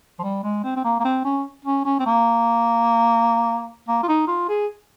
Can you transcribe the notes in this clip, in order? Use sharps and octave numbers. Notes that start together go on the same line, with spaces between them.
F3
G3
G#3
C4
C4
A#3
A#3
C4
C#4
C#4
C#4
C4
A#3
A#3
F4
D#4
F4
G#4